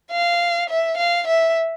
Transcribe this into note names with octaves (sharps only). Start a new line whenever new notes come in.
F5
E5
F5
E5